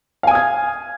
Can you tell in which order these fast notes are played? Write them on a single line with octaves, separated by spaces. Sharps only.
F5 G#5 D#6 G#6